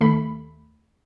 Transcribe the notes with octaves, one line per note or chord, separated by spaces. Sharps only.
D#2 A3 B5